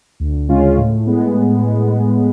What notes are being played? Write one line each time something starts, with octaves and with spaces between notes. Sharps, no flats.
D2
C#3 G#3 C#4 F4
A2
G#3 B3